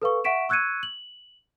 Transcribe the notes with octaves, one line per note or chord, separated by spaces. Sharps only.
A4 B4 F5 C#6
E5 F#5 C#6 B6 D7 E7
C#6 E6 F#6 G#6 C#7 D#7
F#7